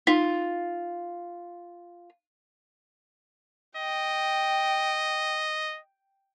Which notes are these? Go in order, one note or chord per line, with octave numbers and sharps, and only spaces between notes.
D#4 F4
D#5 G5